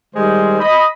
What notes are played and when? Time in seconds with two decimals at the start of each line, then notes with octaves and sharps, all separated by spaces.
0.15 D#3 G3 G#3 C5
0.60 D#5 B5